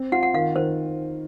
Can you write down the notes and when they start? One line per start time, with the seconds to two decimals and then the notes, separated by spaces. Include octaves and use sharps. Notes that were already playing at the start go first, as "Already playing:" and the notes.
Already playing: C4
0.12 F4 F#5
0.23 F#5
0.34 D#3 F5
0.56 D#3 C5